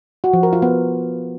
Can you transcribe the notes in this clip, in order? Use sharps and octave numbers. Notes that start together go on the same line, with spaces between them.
F#4
F3
A#4
F4
B3